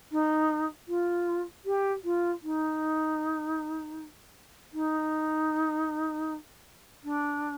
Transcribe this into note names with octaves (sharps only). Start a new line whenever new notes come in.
D#4
F4
G4
F4
D#4
D#4
D4